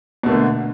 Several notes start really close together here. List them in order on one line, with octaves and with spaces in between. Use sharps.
B2 A3 A#3 D3